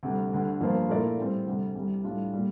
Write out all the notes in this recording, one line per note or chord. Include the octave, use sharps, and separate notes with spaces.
D2 C3 G3
D2 D3 G3
G2 F3 A#3 F4 C5
A#2 A3 E4 A#4 D5
A2 G3 C4
D2 C3 G3
C2 C3 G3
A2 G3 D4 F4
A#2 G3